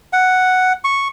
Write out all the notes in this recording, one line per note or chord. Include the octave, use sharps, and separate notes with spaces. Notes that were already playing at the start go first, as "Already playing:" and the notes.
F#5
C#6